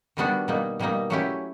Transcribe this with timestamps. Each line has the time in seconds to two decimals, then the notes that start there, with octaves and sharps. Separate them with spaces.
0.17 D#3 G3 B3 D4 F#4
0.48 B2 G3 A#3 D#4
0.80 B2 G3 A#3 D#4
1.10 F#3 A3 C#4 E4 G4